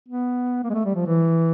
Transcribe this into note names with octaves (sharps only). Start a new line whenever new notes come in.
B3
A#3
G#3
A3
G3
F3
E3